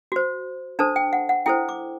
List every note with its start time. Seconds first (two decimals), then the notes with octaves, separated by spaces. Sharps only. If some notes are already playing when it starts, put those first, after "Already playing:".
0.12 F#4 C5
0.79 D4 A4 C5 A5
0.96 G5
1.13 F#5
1.29 F#5
1.46 E4 A4 C5 G5
1.69 D6